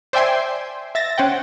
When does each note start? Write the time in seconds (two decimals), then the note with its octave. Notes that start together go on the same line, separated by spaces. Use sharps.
0.13 C5 D5 E5 G5 G#5 C6
0.95 E5 A6 A#6
1.18 C#4 C5 F#5 G5